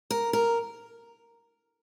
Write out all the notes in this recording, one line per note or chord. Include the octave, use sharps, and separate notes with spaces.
A#4
A#4